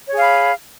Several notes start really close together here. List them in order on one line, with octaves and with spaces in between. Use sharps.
C#5 G#4 F5 B5